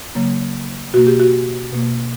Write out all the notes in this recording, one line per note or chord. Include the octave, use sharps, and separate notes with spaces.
C#3 F#3 A#3
B2 A#3 F#4
G4
F#4
B2 A#3